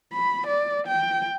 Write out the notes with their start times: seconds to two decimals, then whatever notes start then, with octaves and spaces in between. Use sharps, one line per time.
0.13 B5
0.47 D5
0.87 G5